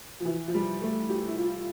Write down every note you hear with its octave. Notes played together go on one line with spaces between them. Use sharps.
F3
E3
F3
G3
A3
G4
E4
F4